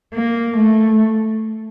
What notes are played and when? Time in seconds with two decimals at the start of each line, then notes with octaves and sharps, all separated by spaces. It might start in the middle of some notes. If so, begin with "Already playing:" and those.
0.15 A#3
0.56 A3